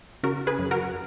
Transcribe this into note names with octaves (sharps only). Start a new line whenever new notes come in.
C#3 F#4 A#4
G#4 B4
F#2
F#4 A#4